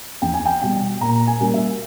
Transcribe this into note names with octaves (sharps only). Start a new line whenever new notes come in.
E2 G5
G#5
G5
B2 G3 G5
A#2 A#5
G#5
G3 A#3 C#4
E5